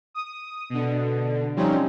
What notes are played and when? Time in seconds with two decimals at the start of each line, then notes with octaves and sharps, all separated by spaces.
0.14 D#6
0.70 B2 D3
1.56 F3 G3 C4 C#4 D#4